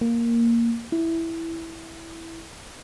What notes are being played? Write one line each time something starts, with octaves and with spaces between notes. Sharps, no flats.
A#3
E4